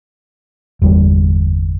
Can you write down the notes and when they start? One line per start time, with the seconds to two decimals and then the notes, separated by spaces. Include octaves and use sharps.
0.82 G1 E2 G3